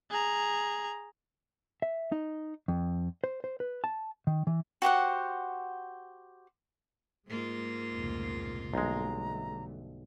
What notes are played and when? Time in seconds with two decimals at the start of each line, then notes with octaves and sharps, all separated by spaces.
0.10 G#4 A#5
1.82 E5
2.12 D#4
2.68 F2
3.24 C5
3.44 C5
3.60 B4
3.84 A5
4.27 D#3
4.47 E3
4.82 F#4 G4 C5 F#5
7.28 G#2 G#3 A#3 F4
7.95 F1 C#2 A#2
8.74 B1 G2 D3 G#3 A3 A#5